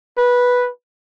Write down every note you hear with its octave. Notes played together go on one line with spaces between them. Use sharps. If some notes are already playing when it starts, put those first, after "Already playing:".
B4